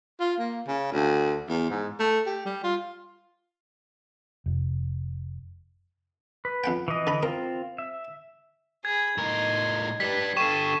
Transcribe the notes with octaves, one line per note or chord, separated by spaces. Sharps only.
F4
A#3
C#3
D2
E2
G#2
A3
G4
G3
F4
F1
B4
F2 F#5 G5
E3 D#5
D3 B5
C4 F4 A#4
E5
G#4 B5 G#6
A2 D#4 A#4 C6
G3 D4 G4 B4 B6
D3 G4 A4 F5 C#6 D#7 E7